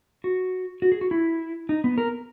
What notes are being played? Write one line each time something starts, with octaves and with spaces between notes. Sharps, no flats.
F#4
F#4
G#4
F#4
E4
D#4
B3
A#4